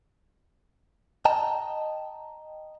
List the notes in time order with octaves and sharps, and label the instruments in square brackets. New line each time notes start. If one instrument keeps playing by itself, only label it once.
[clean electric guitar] D#5 G5 A5 A#5